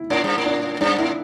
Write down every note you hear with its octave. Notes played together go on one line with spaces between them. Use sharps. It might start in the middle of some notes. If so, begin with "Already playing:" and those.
Already playing: E4
A2 D4
G2
A2
D4
G2 D4
A2 E4